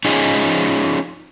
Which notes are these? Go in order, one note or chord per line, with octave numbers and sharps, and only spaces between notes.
C#4 D#4 F4 G#4